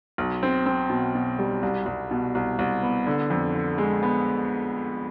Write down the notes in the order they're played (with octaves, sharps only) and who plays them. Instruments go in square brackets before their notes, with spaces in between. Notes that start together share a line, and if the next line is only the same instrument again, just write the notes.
[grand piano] B1
C4
C4
B2
B2
G3
C2
C2
B2
C2
C2
B3
D3
F2
D3
G#3
B3